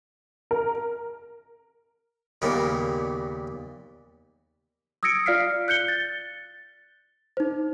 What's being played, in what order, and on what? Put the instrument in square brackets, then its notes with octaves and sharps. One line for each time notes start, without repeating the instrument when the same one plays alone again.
[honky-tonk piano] A#4
[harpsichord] D#2 A#2 C#3 G3 A#3 B3
[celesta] D#6 E6 G#6 A#6 C#7 D7
F4 D5 F5 F6 B6 C7
F#6 G6 C#7 G7
A6
D#4 C5